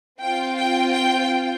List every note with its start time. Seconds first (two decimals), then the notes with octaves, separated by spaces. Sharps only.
0.21 C4 F4 G5
0.57 G5
0.93 G5